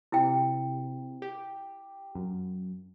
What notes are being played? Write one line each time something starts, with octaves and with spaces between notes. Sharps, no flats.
C3 E4 G5
G4
F#2